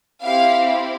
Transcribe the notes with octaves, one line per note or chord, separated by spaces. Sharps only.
C4 E4 G4 F5